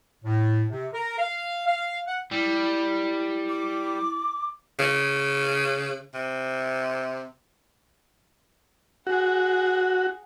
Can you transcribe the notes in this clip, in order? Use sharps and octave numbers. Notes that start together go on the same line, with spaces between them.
A2
C3
A#4
F5
F5
F#5
G3 E4
D6
C#3
C3
F#4 G#4 F#5